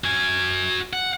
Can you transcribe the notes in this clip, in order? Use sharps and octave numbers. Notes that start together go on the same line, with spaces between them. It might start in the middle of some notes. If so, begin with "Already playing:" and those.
F#4 G#5
F#5